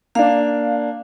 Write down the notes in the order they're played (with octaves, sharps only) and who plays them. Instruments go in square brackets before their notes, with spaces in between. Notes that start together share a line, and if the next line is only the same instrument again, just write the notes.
[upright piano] A#3 D4 [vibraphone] F5